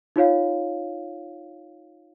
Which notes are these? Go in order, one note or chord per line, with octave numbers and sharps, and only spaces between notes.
D#4 F4 C#5 F5